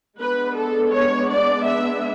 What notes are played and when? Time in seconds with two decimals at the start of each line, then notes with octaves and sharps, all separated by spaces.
0.19 G#3 B3 D4 B4
0.56 A4
0.93 C#5
1.30 D5
1.67 E5